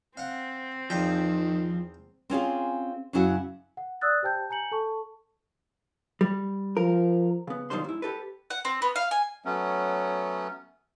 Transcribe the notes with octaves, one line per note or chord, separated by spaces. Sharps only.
C4 F5 F#5
E2 D#3 F3 F5 G5
C4 C#4 F4 G#4
F#2 C#3 E4 F#4 F#5
F#5
D5 D#6 E6 F#6 A6
G4 C5 G5 A5 G6
G#5 A#5 G6 C#7 F#7
A4 A5 C#6
G3
F3 A#4
C#3 B3
B1 D#3 F3 G3 C5 C6
G#2 E4
G4 A4 B4
F#5
C4
B3
F5
G#5
F#3 A3 B3 C#4